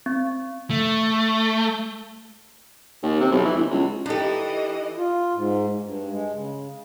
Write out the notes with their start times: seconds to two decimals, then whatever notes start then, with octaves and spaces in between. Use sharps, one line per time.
0.06 C4
0.70 A3
3.03 D#2
3.20 C3
3.31 B1
3.45 E3
3.56 G1
3.71 C#2
4.06 E3 D4 D#4 G4 A4 D#5
4.96 F4
5.35 G#2
5.84 G2
6.11 G#3
6.34 C#3